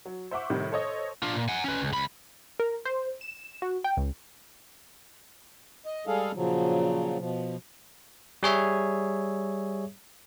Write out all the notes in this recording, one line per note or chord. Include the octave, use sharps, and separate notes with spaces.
F#3
C5 E5 F#5 C#6 D6
A2 C3 D#3 G3
A4 C5 C#5 D#5
D4 F4
A#2
F#5 G#5
C#4 B4
C#2
C#2 B5
A#4
C5
E7
F#4
G5
C#2
D#5
G3 G#3 G#4 A4 F5
A#2 C#3 F3 F#3
B2 F3
G3 G#4 C#5 E5